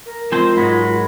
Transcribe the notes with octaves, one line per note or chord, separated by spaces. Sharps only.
A#4
F3 G#3 C4 F4 C5
G#2 F#3 G#3 B5